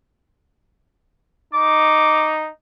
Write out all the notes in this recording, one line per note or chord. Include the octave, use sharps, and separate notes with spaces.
D#4 D6